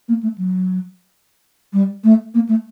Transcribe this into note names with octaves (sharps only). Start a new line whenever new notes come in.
A#3
A3
F#3
G3
A3
A#3
A3